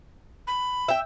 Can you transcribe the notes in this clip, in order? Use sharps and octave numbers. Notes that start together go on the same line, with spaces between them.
B5
E5 G5